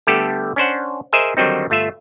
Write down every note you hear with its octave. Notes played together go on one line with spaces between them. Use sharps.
D3 G3 A3 B3 G4 A4
C#4 D4 C5 F#5
G#4 A#4 C5 D#5 E5 G#5
D3 D#3 F#3 G3 C4 D#4
G1 A3 F4 E5